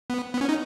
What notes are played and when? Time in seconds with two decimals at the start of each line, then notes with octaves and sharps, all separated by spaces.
0.10 B3
0.33 B3
0.41 C#4
0.49 D#4